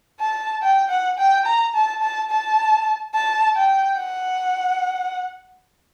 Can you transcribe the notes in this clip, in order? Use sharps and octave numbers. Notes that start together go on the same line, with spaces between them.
A5
G5
F#5
G5
A#5
A5
A5
A5
A5
G5
F#5